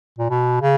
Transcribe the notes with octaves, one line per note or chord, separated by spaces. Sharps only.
A#2
B2
C#3